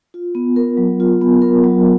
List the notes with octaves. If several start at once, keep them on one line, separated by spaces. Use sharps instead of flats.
F4
B3
A#4
F#3
F4
B3
A#4
F#3